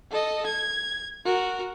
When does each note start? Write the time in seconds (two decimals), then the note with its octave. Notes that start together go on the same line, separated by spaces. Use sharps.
0.11 A4 D#5
0.46 G#6
1.25 F#4 A#4